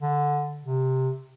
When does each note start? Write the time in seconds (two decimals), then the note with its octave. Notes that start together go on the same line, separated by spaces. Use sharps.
0.01 D3
0.65 C3